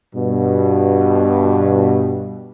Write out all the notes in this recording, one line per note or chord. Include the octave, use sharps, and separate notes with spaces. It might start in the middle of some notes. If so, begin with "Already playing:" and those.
G2 B2